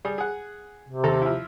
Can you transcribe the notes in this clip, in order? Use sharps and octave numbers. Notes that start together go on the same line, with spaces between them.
G3 G#4
G#4 F#5
C3
D#2 A4 A#5
F3 E4